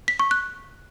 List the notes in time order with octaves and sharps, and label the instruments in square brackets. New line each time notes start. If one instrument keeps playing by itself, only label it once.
[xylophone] B6
C#6
F#6